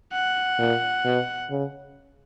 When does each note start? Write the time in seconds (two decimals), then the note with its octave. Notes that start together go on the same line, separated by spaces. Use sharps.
0.13 F#5
0.59 A#2
1.05 B2
1.50 C#3